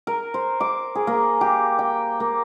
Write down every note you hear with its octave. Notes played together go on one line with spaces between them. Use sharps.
A#4
C5
D6
G#4
A#3
G4
G5
A#3